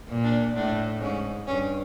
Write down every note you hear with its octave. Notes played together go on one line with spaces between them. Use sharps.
A#2
D4
A2 D4
G#2 C#4
G2 C#4